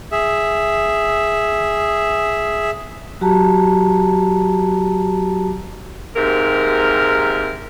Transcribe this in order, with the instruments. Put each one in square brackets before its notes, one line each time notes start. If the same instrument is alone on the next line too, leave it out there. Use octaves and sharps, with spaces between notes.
[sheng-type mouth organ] G#4 E5
[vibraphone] F#3 F#4 G4 A5 A#5
[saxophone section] D#2 G#2 C3 A#4